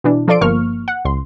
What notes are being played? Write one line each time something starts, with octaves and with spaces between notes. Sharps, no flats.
B2 E3 D4
F3 F4 A4 D5 C6 D7
G1 F3 A#3 C#6 F6
F#5
C#2 C6